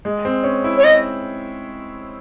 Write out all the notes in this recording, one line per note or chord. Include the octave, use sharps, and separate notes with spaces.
G#3
C4
C#4
E4
C#5
D#5